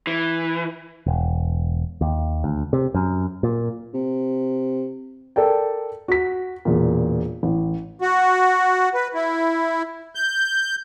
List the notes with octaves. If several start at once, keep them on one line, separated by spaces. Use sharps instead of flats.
E3
E1
D#2
D2
C3
F#2
A#2
C3
A4 A#4 D5 G5
F#4 B6
E1 A#2
A1
F#4
B4
E4
G6